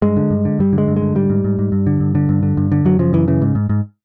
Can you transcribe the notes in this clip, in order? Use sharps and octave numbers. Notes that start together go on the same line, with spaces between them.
G2 G#3
D3
G2
D3
G2 G3
D3
G#3
G2
G#3
D3
G#2 G3
G#2
G#2
G#2
G2
D3
G2
D3
G2
D3
G2
D3
F#2 F#3
C#3 F3
F#2 E3
C#3 E3
G#2
G#2
G#2